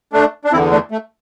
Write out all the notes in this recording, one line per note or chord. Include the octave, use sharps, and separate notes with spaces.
A3 D4
D4
E2 D3 C4 E4
A3 D4
A3